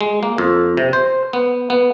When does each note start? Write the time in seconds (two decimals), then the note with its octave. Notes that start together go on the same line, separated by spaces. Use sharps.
0.01 G#3
0.23 A#3
0.38 F2
0.77 C3
0.93 C5
1.33 B3
1.70 B3